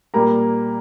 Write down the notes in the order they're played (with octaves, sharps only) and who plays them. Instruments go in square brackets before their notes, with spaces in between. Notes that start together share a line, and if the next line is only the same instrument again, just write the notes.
[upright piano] A#2 G3 A#3 A#5